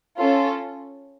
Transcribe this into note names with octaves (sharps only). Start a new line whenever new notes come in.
C#4 F4 A4